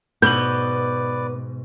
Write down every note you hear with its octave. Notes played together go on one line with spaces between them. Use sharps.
G#2 B2 B3 B4 D5 G6 F#7